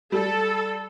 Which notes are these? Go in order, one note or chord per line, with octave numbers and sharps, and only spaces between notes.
G3 A4